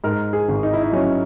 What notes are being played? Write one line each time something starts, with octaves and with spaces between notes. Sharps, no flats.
G#2 A#4
G#4
G#1
D#4
E4
D#4
F#3 C#4